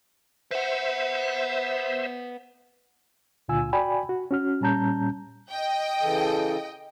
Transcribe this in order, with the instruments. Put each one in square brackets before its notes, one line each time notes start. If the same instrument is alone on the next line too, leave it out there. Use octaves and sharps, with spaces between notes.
[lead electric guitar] B4 F#5 [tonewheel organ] C5 E5
[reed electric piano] C#2 A#2 D3 F4 G#5 E6
F#4 D5 G5 G#5 B5
F#4
C#4 F#4 F6
A#2 G3 C#4 A5 A#5 G6
[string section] D#5 G5
[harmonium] C#3 E3 A4